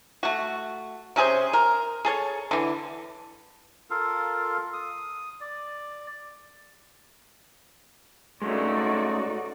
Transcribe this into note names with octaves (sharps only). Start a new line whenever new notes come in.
A3 F#4
C3 C#4 G#4 C5
A#4
G#4 A4 C#5
D3 E3
F4 A4 A#4 F5
D#6
D5
G#3 A3 C#4 D#4 F#4 D5